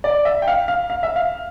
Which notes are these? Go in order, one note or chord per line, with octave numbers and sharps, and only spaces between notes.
D5
E5
G5
F5
F5
F5
E5
F5